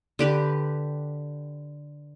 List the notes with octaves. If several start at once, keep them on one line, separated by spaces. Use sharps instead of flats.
D3 G4 B4